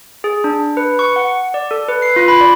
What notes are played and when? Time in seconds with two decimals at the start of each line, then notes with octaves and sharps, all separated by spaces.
0.24 G#4
0.44 D4
0.77 B4
0.99 C#6
1.16 F#5
1.54 D5
1.71 A4
1.89 B4
2.02 C7
2.16 F4
2.28 B5
2.41 D5